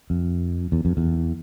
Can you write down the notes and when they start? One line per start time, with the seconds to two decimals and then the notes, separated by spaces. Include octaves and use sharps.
0.10 F2
0.72 E2
0.85 F2
0.97 E2